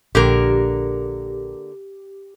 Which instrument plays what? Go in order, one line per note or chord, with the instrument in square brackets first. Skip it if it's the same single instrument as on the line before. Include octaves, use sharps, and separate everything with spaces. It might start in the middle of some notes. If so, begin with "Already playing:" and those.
[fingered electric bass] A#1 [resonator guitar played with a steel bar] D3 A#3 A#4 [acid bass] G4